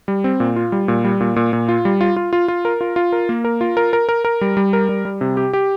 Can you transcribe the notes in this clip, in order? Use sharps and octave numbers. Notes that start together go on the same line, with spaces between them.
G3
C4
A#2
F4
G3
A#2
G3
A#2
A#2
A#2
F4
G3
F4
F4
F4
F4
A#4
F4
F4
A#4
A#3
A#4
F4
A#4
A#4
A#4
A#4
G3
G3
A#4
G3
G3
C3
G4
G4